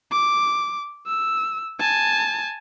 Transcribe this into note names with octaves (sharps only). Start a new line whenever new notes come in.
D6
E6
G#5 A5